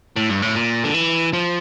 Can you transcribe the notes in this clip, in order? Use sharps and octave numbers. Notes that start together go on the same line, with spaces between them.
A2
G2
A2
A#2
D3
E3
F3